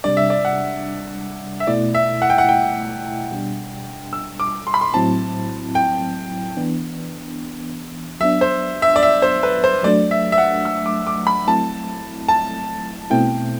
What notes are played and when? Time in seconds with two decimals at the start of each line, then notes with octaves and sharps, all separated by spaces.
0.04 C3 G3 D4 D5
0.17 E5
0.30 D5
0.45 F#5
1.60 E5
1.67 B2 A3 E4 D5
1.95 E5
2.22 F#5
2.30 G5
2.38 F#5
2.49 G5
3.31 B2 G3 D4
4.13 E6
4.40 D6
4.67 C6
4.74 B5
4.81 C6
4.94 A2 F#3 C4 E4 A5
5.75 G5
6.57 E3 B3 D4
8.20 F#3 B3 D4 E5
8.41 C5
8.82 E5
8.96 D5
9.03 E5
9.22 C5
9.43 B4
9.64 C5
9.83 F#3 A3 D4 D5
10.11 E5
10.32 E5
10.38 F#5
10.65 E6
10.86 D6
11.07 D6
11.27 B5
11.47 F#3 A3 C4 E4 A5
12.28 A5
13.10 B2 A3 C4 E4 G5